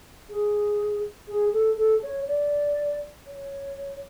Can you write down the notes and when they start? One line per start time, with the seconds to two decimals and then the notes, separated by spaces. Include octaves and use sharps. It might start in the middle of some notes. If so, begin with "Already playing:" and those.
0.30 G#4
1.28 G#4
1.53 A4
1.77 A4
2.03 C#5
2.27 D5
3.27 C#5